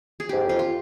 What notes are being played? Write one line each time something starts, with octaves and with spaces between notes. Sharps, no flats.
G#4
G#2 G4
F2 F4
F4